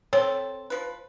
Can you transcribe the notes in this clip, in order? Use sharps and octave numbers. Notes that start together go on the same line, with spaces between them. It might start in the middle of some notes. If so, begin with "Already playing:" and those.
C4 A4 C#5
F3 B4